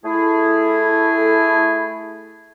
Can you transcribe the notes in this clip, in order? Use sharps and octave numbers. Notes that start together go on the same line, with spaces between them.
A3 E4 G#4